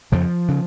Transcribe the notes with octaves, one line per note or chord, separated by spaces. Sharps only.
F2 C#3 F3
C#3